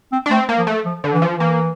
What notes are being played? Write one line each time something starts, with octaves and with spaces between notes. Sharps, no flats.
C4
D4
A3 C4
A#3
F3
A3
F3
D3
E3
F3
E3 A#3